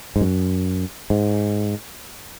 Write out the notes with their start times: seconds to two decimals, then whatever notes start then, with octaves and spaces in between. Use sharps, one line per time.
0.16 G#2
0.21 F#2
1.10 G#2